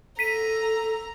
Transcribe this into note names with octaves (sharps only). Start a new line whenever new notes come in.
A4 A#5 B6 D#7